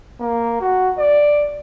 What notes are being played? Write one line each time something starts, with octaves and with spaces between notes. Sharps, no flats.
A#3
F#4
D5